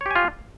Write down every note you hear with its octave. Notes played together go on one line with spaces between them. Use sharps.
F4 G4 C#5 G#5